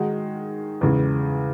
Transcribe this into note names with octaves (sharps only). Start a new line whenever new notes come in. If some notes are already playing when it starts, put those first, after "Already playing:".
Already playing: D#3 G#3 D#4 F#4
E2 C#3 G#3